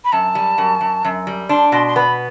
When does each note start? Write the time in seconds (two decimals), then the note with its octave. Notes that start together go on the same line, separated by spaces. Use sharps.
0.04 B5
0.12 F#2 A5
0.35 G3
0.58 F#2
0.81 F#2
1.05 F#2
1.27 G3
1.49 D4 C6
1.72 B2 C6
1.87 C6
1.96 B3 B5